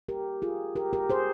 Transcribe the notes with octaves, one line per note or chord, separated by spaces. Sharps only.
G4 A#4
F4 G#4
G4 A#4
G4 A#4
G#4 C5